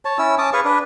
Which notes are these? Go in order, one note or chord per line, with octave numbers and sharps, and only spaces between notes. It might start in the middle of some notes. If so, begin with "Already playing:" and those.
C#5 A5
C#4 E4 E6
C#4 A5 D6 D#6
G#4 B4 F5 C#6
D4 B4